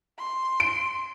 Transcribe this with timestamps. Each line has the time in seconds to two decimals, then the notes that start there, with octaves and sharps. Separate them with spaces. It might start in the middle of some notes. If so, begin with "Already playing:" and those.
0.18 C6
0.60 D7